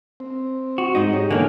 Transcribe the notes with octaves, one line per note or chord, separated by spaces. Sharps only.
C4
F#4
G#2 D#4
G4 C#5
D3 E3 A#3 B3 G#5